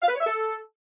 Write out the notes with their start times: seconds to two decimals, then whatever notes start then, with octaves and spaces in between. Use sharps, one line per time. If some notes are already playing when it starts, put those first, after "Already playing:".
0.02 F5
0.08 B4
0.14 C#5
0.20 E5
0.26 A4